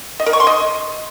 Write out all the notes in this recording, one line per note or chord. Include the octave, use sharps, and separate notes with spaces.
D#5
A#4
C#6
C6
D#5